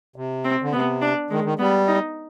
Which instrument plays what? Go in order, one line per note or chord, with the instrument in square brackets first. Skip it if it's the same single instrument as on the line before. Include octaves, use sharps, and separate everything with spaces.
[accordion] C3
[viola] C4
[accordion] D3
[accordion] C3 [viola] B3
[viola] D4
[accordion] D#3 [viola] G#3
[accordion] D#3
[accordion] G3 [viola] B3
[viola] D#4